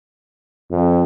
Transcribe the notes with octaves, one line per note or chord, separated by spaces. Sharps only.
F2